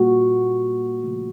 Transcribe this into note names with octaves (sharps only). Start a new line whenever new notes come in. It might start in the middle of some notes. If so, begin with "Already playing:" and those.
Already playing: A#2 G3 A#3 F#4
C#3 F3 A3